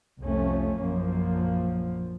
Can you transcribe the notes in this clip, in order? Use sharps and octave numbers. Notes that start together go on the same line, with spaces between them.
C2 F2 F3 A3 C#4
A#1 F#2 F3 A#3